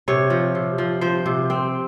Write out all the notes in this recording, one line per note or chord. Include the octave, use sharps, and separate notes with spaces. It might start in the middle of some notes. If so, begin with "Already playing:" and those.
C3 C#5
F3
C3
F3
F3 C5
C3
C4